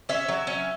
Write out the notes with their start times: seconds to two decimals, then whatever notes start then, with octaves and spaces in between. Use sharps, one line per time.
0.09 C#4 E5
0.28 F#3
0.47 C#4